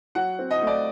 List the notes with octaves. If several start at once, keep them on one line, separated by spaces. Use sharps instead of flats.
F#3 F#5
C4
D#5
A3
D5